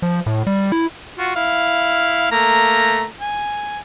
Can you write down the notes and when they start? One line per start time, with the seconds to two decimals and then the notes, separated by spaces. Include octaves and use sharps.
0.02 F3
0.26 A2
0.47 G3
0.72 E4
1.18 F4 F#4
1.36 E4 F5
2.31 A3 A#3 A#5
3.21 G#5